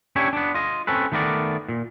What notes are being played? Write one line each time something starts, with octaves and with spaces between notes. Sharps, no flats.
C#4 D4 E4 G4 C#5
B3 D4
F4 D#5
C4 C#4 A4 B4
D#3 A3 B3 A#4 D5
A#2